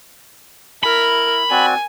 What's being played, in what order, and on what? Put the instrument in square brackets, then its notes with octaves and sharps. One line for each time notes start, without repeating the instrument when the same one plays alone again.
[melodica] E4 [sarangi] A#4 [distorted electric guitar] B5
[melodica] C4 F#4 D5 [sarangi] G#5